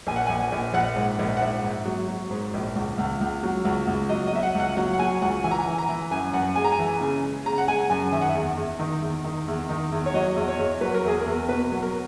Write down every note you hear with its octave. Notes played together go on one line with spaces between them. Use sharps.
A#1 G#5
F#5
A#1 G#5
A#1
A#1 F#5
G#2
A#1
F#5
G#2 E5
G#2
F#3
F#3
G#2
A#1
C#2
C#2
C#2
F#3
C#2
C#2
F#3 D#5
D#5
F#3 E5
F#5
C#2
F#5
F#3 F#5
F#5
F#3 G#5
C#2 F#5
E3 G#5
A#5
G#5
E3
A#5
E3
F#2 G#5
F#2 F#5
G#3 G#5
A#5
G#5
E3
C#3
G#3
C#3 A#5
F#5
G#3 G#5
F#2 G#5
D#3 E5
F#5
E5
E2
E2
D#3
E2
D#3
E2
D#3
E2
C#5
F#3 D#5
E2
C#5
E2
F#3 B4
A#4
E2 G#4
A#4
E2
B2 B4
F#3
A#4